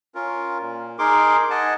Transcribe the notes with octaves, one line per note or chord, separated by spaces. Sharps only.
C#4 F4 A#4
A#2
D#4 G#4 A#4 C6 D6
D#5 F#5 G#5 A5